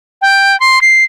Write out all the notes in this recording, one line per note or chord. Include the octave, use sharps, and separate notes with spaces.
G5
C6
C7